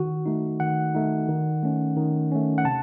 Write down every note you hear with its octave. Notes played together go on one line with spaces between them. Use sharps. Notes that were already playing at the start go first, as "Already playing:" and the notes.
Already playing: D#3 F#4
A3 D#4
D#3 F#5
A3 D#4
D#3
A3 C#4
D#3
A3 C#4
F#5
C3 A5